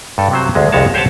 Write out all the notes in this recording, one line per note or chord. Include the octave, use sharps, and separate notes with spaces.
G2 A4
C3 F#3 C5
D2 G#3
C2 F2 G#3 C#5 A5
G4 C5 C#5 F#5 G5 A5